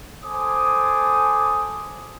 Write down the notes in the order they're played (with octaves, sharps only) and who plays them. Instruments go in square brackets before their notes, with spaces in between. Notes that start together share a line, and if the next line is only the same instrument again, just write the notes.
[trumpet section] A4 C5 G#5 D6 D#6